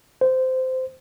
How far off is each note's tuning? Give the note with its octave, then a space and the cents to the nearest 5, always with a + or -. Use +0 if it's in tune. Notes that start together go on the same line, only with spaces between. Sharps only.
C5 -15